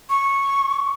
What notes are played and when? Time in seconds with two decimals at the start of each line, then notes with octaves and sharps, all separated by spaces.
0.09 C#6